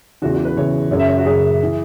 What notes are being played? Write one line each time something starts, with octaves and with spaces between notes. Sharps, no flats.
E2 C#3 E3 F#4
F#4
B4
E2 C#3 E3 C#5
F#2 C#3 F#3 C#5
E5
C#5
F#4
F#2 C#3 F#3 G#4
E3